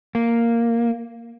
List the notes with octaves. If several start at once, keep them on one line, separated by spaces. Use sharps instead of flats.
A#3